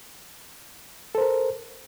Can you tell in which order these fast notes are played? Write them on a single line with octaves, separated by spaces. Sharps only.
A4 C5 A#4